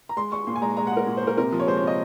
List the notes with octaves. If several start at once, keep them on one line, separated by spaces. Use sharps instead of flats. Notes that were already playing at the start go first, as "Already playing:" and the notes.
A#5
G#3 C6
G#3 C#6
A#2 C6
G#5
G#3 A#5
G#3 A#5
F#5
G#3 A#4
A#2
C5
A#2 A#4
C3 A#4
F3
C#5
G#3 C5
C#5
C3
D#5